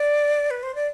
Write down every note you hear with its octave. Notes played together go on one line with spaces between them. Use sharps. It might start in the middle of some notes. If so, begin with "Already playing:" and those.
Already playing: D5
B4
C5
D5